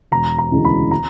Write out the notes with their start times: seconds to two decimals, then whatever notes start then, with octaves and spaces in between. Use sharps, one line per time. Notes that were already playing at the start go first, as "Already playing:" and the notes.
0.12 E1 A#5
0.38 A#5
0.52 D2 C#3 E3 G#3
0.65 B5
0.91 A#5